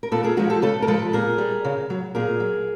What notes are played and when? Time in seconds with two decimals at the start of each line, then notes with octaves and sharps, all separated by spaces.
0.03 A#4
0.12 A#2 A4 B4
0.24 G#4 A#4
0.37 F3 G#3 F#4 G#4
0.50 G4 A4
0.62 C#3 A4 B4
0.82 A#4
0.87 F3 G#3 A4 B4
1.13 A#2 G#4 A#4
1.38 G3
1.65 C#3
1.90 F#3
2.15 A#2 G#4 A#4
2.40 F#3